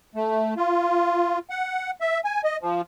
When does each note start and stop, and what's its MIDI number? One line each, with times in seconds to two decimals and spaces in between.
0.15 0.54 57
0.57 1.39 65
1.50 1.91 78
2.01 2.20 76
2.25 2.41 80
2.44 2.57 75
2.62 2.82 53